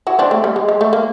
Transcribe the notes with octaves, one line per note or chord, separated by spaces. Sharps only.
E4 F#4
C4 D4
A3
G3
G#3
G#3
A3
A#3